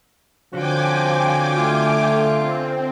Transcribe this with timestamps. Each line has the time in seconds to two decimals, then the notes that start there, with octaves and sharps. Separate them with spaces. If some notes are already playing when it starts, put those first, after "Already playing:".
0.54 D3 F3 C4 C#4 F#4 G5 G#5 D6
1.57 A3 F4
2.39 C4